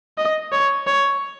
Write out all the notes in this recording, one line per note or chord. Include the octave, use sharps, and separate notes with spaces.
D#5
C#5
C#5